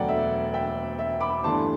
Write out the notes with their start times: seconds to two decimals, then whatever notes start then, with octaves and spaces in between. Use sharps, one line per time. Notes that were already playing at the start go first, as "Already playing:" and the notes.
Already playing: E1 D2 D3 F#3 D5 F#5 G5
0.09 E5
0.54 E5 G5
0.99 E5
1.21 B5 D6
1.43 G1 G2 E3 A3 D4 A5 C6